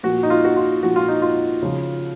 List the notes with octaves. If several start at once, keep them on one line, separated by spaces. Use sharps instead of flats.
A#2 F3 F#4
D#4
F4
F#4
F4
A#2 F3 F#4
F4
D#4
F4
C#3 F3